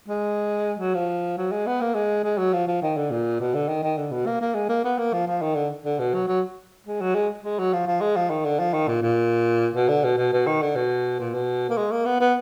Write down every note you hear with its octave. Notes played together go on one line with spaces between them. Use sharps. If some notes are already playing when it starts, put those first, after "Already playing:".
G#3
F#3
F3
F#3
G#3
B3
A#3
G#3
G#3
F#3
F3
F3
D#3
D3
A#2
B2
D3
D#3
D#3
D3
B2
A#3
A#3
G#3
A#3
B3
A#3
F3
F3
D#3
D3
D3
B2
F#3
F#3
G#3
F#3
G#3
G#3
F#3
F3
F3
G#3
F3
D#3
D3
F3
D#3
A#2
A#2
B2
D3
B2
B2
B2
D#3
D3
B2
A#2
B2
A#3
G#3
A#3
B3
B3